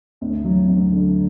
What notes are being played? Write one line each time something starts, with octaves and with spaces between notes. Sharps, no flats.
D2
F#3
D2
D3